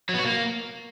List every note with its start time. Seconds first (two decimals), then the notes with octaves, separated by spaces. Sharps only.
0.09 F#3
0.14 B3
0.19 F#4
0.24 A#3